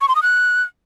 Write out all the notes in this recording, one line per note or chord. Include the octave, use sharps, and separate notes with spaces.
C#6
C6
D#6
F#6